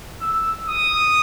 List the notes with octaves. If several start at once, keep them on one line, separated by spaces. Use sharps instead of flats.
E6
D#6